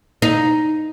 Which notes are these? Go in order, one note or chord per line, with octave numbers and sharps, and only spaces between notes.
D#4